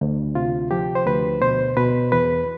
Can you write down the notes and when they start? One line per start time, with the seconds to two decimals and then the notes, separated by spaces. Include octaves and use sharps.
0.01 D2
0.35 C3 F4
0.71 F3 G4
0.95 C5
1.06 D2 B4
1.41 B2 C5
1.77 B2 B4
2.12 E2 B4